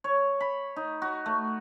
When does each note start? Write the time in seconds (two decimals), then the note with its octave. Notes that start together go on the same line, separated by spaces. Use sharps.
0.04 C#5
0.40 B5
0.76 D#4
1.02 F#4
1.26 A3